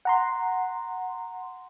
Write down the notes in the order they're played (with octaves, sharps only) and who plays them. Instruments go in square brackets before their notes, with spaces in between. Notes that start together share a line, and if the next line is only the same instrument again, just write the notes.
[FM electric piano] F#5 A#5 C6